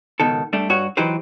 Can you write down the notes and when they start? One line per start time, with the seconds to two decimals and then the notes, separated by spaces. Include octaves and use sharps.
0.20 C#2 B2 D#3 A4
0.53 G3 A3 D4
0.70 G2 F#4 C#5
0.97 E3 F#3 D#4 G4 B4 C5